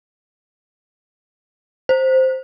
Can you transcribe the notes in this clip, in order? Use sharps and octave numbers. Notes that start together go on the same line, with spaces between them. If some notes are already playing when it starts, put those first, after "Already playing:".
C5